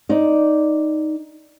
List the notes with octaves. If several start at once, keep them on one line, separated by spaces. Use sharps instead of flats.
D#4 D5